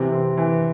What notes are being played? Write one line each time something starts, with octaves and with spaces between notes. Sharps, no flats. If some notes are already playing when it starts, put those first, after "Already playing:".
Already playing: C3 E3
C4
E3